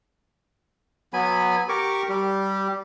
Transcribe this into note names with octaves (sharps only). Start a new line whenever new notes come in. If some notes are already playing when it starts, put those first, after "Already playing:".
F#3 B3 G#5 B5
G4 A#4 C#6 D6
G3 G4